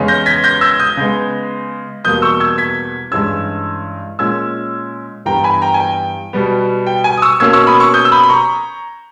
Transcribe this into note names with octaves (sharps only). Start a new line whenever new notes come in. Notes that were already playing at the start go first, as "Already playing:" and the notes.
Already playing: E2 C#3 G#3 C#4
G6 A#6
G#6 B6
G6 A#6
E6 G#6
D#6 G6
C#3 G#3 B3
E2 B2 G3 A#3 D#6 G6
C#6 E6
E6 G#6
G#6 B6
G2 E3 G#3 C#4 E6 G#6
A#2 G#3 C#4 E6 G#6
G2 E3 G3 B3 G5 A#5
G#5 B5
G5 A#5
G#5
G5
B2 G3 B3
G5
G#5
D#6
C#6 E6
B2 A#3 C#4 E6 G#6
C#6 E6
B5 D#6
C#6 E6
D#6 G6
E6
B5 D#6
B5
A#5 C#6